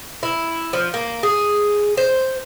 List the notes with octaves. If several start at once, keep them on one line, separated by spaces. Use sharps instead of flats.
E4
F3
A#3
G#4
C5